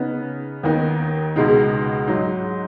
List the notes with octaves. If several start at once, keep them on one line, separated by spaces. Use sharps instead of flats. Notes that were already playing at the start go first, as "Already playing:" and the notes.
Already playing: C#3 B3 D#4
D#2 D#3 B3 D#4
C#2 B2 G#3 D#4
G#2 F#3 D#4